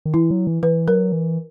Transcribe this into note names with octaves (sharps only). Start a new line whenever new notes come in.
D#3
E3 E4
F#3
E3
E3 B4
F#3 A#4
E3